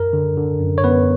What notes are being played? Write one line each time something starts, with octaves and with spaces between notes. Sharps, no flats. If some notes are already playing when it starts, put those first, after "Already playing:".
Already playing: F#2 A#4
D3
D3
F#2
C#5
F#2 B3 B4